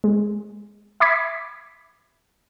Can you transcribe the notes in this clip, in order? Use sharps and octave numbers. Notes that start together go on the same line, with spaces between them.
G#3
E5 B5 D6 G#6 B6